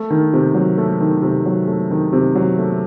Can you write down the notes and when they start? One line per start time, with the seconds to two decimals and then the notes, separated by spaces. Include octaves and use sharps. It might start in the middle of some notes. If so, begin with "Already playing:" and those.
Already playing: A3
0.10 D#3
0.33 C3
0.55 F#3
0.78 A3
1.00 D#3
1.22 C3
1.46 F#3
1.67 A3
1.91 D#3
2.13 C3
2.35 F#3
2.58 A3